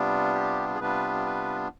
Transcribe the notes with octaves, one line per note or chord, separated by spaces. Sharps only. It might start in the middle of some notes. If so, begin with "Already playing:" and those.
Already playing: C3 G3 B3 D4 F4
G4
G#4
C3 G3 B3 D4 F4 B4
B4